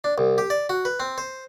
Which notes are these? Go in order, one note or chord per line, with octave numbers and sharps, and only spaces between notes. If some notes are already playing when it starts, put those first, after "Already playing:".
D4
C2
G4
D5
F#4
B4
C4
C5